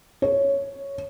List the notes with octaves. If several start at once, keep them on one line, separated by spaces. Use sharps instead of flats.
C#5